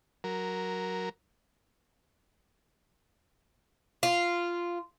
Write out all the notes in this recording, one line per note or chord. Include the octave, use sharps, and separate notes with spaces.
F#3 A#4
F4